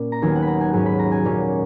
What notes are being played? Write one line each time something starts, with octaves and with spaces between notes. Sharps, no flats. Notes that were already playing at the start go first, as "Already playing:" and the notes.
Already playing: A#2 C#4
A#5
D#2 D#3 F#3 B3 G#5
F#5
B5
A#5
G#5
G#2 F#3 C#4 G#5
B5
A#5
G#5
A#2 F#3 A#3 C#4